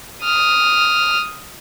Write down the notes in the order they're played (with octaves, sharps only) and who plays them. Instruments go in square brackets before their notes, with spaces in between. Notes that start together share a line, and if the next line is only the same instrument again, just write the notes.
[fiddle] D#6 F6